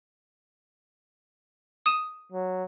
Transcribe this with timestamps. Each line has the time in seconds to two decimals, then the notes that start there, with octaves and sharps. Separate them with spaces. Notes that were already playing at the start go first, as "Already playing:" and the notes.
1.86 D#6 D#7 E7
2.32 F#3